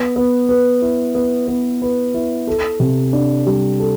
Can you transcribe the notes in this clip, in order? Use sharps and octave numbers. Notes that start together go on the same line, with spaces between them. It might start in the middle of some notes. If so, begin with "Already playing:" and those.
Already playing: B3
B3
B4
E4
B3
B3
B4
E4
A4
C3
D4
G3
A4